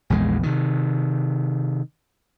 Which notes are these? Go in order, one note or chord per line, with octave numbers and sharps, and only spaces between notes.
A#1 E2 F3 G#3
C3 D#3